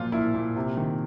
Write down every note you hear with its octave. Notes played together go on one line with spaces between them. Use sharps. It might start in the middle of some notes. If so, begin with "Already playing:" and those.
Already playing: A#2 F3 F#3 F4
A#2 E4
A#2
C3
D#3